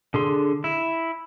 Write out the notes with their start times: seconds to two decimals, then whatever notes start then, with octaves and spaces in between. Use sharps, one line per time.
0.14 D3 G#4 C6
0.64 E4